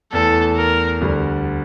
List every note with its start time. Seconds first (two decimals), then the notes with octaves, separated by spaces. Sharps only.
0.12 E2 E3 A3 A4
0.57 A#4
1.01 D2 D3 G3